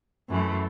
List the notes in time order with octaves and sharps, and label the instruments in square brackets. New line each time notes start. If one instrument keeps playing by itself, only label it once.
[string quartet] F#2 E3 A3